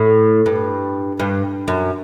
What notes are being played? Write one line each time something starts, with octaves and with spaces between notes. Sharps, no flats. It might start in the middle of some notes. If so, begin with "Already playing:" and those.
Already playing: A2
G2
G2
F#2